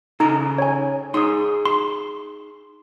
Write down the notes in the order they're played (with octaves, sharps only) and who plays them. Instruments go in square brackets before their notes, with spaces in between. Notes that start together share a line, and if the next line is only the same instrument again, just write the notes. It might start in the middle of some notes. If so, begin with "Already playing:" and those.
[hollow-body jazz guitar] C#3 A4 A#5 [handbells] D#4
[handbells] C#5 G#5
[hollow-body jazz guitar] D#4 G#4 [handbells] C6 D#6
[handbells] C6